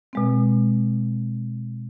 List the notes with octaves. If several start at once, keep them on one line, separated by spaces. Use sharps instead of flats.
B2 G#3 C4